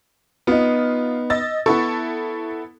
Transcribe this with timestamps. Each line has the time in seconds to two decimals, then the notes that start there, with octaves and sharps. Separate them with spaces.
0.47 B3 D#4 F4
1.30 D#5 E6 A6
1.66 B3 E4 A4 C#6